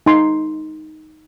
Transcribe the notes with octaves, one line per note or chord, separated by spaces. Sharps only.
D#4 C6